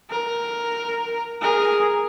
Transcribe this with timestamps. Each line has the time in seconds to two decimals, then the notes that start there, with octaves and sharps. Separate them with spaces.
0.11 A#4
1.42 G#4 A#4